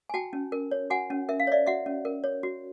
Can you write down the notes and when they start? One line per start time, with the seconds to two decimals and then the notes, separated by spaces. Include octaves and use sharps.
0.09 G#5
0.14 F#4 G5 A5
0.33 C#4
0.52 A#4
0.72 C#5
0.90 F#4 F#5 G#5
1.10 C#4
1.29 A#4 E5
1.40 F5
1.47 C#5 D5 E5
1.67 F#4 E5 F#5
1.86 C#4
2.05 A#4
2.24 C#5
2.43 F#4